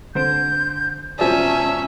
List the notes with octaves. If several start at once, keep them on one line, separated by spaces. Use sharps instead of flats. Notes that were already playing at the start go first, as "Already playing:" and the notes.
D3 C5 G6 D7
E1 F3 C#4 D5 E5 G#5 A5